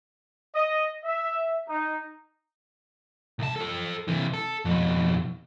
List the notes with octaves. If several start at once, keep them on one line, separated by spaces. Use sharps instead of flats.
D#5
E5
D#4
C2 A5
F4 A4
C3 E3
A4
F2 B2